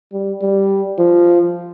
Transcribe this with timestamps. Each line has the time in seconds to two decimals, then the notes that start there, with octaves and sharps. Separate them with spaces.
0.12 G3
0.41 G3
0.98 F3